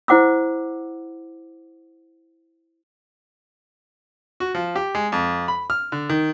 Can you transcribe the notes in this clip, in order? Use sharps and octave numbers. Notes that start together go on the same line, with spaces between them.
E4 C5 F#5 D6 E6
F#4
F3
G4
G#3
F2
B5
F6
D3
D#3